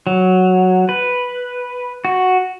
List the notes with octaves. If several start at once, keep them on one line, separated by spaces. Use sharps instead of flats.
F#3
B4
F#4